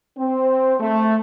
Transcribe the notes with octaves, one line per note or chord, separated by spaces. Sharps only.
C4
A3